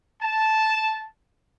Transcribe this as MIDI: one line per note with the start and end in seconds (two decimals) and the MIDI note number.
0.22 1.07 81